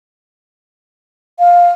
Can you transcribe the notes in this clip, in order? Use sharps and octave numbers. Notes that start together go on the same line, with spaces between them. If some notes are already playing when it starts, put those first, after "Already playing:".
F5